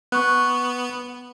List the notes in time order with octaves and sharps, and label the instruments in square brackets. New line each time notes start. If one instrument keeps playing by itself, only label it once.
[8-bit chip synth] B3 [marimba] C#6 F#6